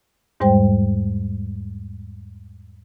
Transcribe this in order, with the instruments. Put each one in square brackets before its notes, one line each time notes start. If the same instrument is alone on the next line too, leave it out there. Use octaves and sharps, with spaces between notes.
[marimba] E2 G#2 G3 G#3 C5 G5